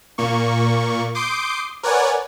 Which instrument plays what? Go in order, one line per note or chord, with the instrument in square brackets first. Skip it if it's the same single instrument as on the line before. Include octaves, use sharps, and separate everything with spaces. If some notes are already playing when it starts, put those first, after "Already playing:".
[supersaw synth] A#2 A#3 C#6
C6 D6 D#6 G6 C7 D7
A#4 B4 C#5 D5 F#5 G#5